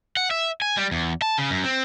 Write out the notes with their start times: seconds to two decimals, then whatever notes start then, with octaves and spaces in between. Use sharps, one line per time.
0.17 F#5
0.31 E5
0.62 G#5
0.77 G3
0.91 E2
1.22 A5
1.38 C#3
1.50 F#2
1.64 C4